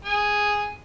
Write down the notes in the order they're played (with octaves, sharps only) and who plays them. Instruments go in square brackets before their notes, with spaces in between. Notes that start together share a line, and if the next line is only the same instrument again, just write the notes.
[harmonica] G#4